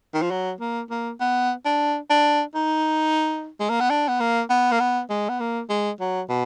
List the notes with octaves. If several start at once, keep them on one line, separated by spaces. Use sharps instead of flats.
D#3
F3
F#3
A#3
A#3
B3
D4
D4
D#4
G#3
A#3
B3
D4
B3
A#3
B3
A#3
B3
G#3
B3
A#3
G#3
F#3
B2